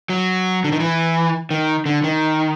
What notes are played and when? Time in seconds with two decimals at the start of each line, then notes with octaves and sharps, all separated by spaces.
0.09 F#3
0.64 D3
0.72 D#3
0.80 E3
1.51 D#3
1.86 D3
2.04 D#3